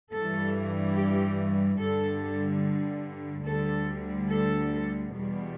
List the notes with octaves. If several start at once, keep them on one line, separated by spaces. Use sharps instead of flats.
G2 E3 G3 A4
G4
G2 D3 G3 A4
D2 D3 G3 A4
A4
E2 B2 G3